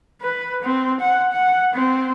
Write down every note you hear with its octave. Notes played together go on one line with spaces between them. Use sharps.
B4
C4
F#5
F#5
C4